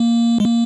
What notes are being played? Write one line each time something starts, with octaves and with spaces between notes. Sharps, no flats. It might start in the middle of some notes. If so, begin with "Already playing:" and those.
Already playing: A#3
G#3
A#3